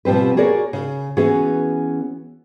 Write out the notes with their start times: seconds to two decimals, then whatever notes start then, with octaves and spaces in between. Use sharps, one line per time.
0.05 B2 F3 G3 C4 B4
0.37 F#4 G#4 A#4 C#5 D5
0.73 C#3
1.17 E3 B3 C#4 F#4 G#4